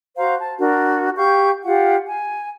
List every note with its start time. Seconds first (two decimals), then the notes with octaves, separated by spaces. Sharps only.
0.17 F#4 C5 F5 A#5
0.38 A5
0.59 D4 F#4 A#4
1.16 G4 F5 C#6 G6
1.65 F4 G4 F5 F#5
2.07 G#5